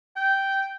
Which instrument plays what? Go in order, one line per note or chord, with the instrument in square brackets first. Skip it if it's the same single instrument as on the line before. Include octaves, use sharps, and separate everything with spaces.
[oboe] G5